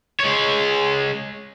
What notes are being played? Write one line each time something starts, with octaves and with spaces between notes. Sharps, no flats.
G#3 C#5